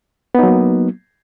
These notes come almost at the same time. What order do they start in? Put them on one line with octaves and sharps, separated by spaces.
B3 D#4 F#3 A#3